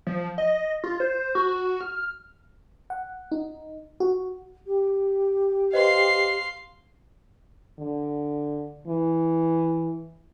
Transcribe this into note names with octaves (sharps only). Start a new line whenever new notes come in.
F3
D#5
F4
C5
F#4
F6
F#5
D#4
F#4
G4
B4 C5 D#5 F5 C6
D3
E3